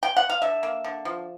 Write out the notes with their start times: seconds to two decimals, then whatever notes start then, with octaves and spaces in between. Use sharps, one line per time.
0.03 G5
0.17 F#5
0.29 F5
0.42 D3 E5
0.63 A#3
0.84 D3
1.05 F3